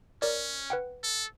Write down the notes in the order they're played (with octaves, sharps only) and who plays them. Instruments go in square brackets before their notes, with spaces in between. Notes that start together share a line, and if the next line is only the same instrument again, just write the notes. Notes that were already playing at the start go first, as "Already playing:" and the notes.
[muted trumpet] C#4 [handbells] A#4 C#5 D5
[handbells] B4 F#5 G5
[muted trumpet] A4